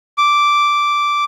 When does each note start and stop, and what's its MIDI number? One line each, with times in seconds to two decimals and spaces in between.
0.18 1.24 86